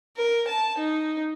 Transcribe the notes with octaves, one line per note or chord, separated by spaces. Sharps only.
A#4
A5
D#4